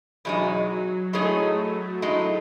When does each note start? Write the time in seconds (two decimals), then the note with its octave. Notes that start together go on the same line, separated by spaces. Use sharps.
0.25 E2 B2 F#3 G#3 D#4
0.70 F#3
1.13 A2 G#3 A3 D#4 G#4 C#5
2.02 A2 G#3 D#4